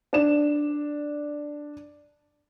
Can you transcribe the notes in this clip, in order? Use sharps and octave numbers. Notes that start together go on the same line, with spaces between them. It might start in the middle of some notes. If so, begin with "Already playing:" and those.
D4 D5 E7